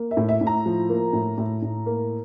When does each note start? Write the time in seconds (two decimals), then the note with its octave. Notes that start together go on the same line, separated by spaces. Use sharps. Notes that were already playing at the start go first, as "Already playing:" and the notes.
Already playing: A#3
0.11 E5
0.17 A2
0.29 E5
0.41 A2
0.47 A#5
0.66 F3
0.89 A#3
1.13 A2
1.38 A2
1.62 A2
1.86 A#3